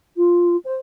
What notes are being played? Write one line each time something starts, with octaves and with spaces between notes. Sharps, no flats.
F4
C5